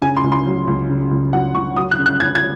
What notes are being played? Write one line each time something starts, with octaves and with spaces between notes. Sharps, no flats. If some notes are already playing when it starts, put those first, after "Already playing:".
C#3 G#5
C6
C#2
C6
F#3
C#2
C#3
C#2
F#3 F#5
C#2 C#6
F#3 D#6
F#6
C#3
F#6
C#4 G#6
G#6